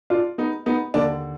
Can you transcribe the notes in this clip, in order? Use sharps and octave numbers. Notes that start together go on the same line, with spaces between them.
D4 F4
B3 D#4
B3 D#4
D#2 D3 A#3 D4